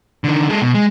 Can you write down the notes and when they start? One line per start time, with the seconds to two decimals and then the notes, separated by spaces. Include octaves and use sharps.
0.24 D3 D#3
0.49 G#3 A4
0.61 B2
0.74 G#3